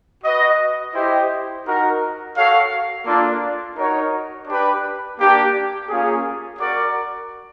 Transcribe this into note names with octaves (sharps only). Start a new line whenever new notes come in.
F#4 B4 D#5
E4 G4 C5 D#5 G5
D#4 F#4 A#4
F#4 A4 C#5 F5
A#3 D4 F4 A4 D5
D#4 F#4 A#4 C#5
D4 G4 B4
A#3 D4 G4
A#3 C#4 F4 G#4
F#4 A#4 D5